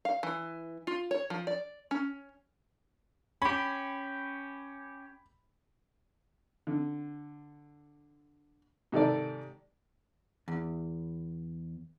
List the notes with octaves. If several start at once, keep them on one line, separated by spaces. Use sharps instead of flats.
F5
E3
F4
C#5
F3
D5
C#4
C#4 G4 B5
D3
G#2 C3 D#3 A4 D5
E2